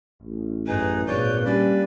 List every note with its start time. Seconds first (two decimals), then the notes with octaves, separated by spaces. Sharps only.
0.23 A1
0.67 F#2 D#4 G#4 B4
1.08 G#1 A#2 A#3 B4 C#5 D5 G6
1.45 G3 C#4 D4 B4 D5